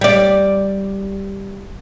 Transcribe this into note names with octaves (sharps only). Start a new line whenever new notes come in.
G3 D5